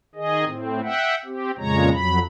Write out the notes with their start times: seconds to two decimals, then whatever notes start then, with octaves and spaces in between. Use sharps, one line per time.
0.15 D#3 G#4 D#5
0.44 A2 C4
0.83 E5 F#5 G5
1.25 C4 G4
1.58 F2 A#2 C#3 G#3 C#5 A#5
1.93 F2 F#3 B5